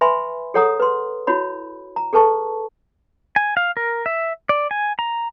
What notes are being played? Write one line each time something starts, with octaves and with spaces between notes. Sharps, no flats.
B4 E5 G#5 B5 C6
G#4 A4 C#5 F#5 A#5 D#6
B4 C6
E4 F#4 C#5 B5
A#5
G#4 A4 B4 A5 C#6
G#5
F5
A#4
E5
D5
G#5
A#5